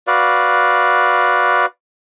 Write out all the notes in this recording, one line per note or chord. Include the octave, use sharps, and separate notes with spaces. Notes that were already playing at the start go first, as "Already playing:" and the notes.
F#4 B4 D5 F5